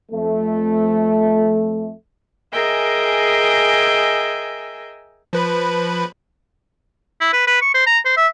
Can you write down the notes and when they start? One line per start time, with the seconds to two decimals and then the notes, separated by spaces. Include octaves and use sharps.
0.12 F2 A3
2.52 G#4 A#4 D#5 E5 G5 G#5
5.33 F3 B4 B5
7.21 E4
7.33 B4
7.47 B4
7.62 C#6
7.74 C5
7.87 A#5
8.05 C5
8.17 E5